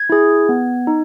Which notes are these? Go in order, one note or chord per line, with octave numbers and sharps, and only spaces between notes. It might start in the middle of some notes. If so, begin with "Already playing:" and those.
Already playing: G#6
E4 G#4
B3
D#4